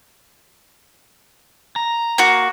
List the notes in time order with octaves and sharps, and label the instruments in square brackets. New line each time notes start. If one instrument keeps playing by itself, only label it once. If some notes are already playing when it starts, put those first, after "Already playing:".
[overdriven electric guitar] A#5
[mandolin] A#3 F#4